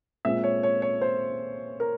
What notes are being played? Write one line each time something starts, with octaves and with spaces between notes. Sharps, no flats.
A#2 G#3 C4 E5
C#5
C#5
C#5
C5
A#4